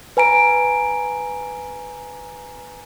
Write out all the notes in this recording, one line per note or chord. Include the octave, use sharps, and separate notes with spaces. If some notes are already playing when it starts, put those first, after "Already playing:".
B4 G#5 A#5 D7